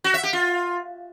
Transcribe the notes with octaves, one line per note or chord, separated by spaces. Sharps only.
F#4
E5
G4
F4